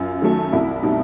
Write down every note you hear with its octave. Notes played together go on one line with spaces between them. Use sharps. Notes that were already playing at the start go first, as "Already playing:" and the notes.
Already playing: F#2 F4
D#3 F#3 A3
C2 E4
B2 G3 D#4